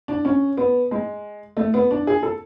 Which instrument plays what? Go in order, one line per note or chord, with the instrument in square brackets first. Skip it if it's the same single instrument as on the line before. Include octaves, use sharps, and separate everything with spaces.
[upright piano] D4
C#4
B3
G#3
A3
B3
D4
G#4
A4